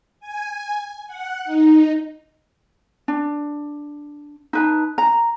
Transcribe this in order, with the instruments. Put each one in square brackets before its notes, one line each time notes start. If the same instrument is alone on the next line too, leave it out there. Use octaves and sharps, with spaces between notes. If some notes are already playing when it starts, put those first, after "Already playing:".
[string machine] G#5
F#5
D#4
[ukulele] D4
D#4 B4 A5
A#5